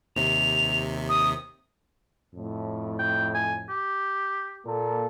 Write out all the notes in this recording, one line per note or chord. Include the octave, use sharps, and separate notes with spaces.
D#2 C3 F7
D#6
F2 A2
G5
G#5
G4
A#2 A#3 A4